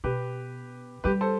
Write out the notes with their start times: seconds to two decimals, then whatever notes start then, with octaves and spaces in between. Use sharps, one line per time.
0.04 B2 G4 B4
1.04 G3 G4 B4
1.21 A4 C5